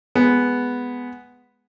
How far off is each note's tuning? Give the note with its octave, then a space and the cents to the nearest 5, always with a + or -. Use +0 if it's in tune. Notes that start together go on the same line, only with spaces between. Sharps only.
G#3 +0 B3 +0